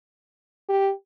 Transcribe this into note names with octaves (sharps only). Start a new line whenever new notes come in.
G4